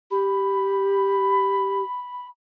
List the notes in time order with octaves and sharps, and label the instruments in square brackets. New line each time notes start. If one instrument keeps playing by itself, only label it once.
[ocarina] G4 [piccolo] B5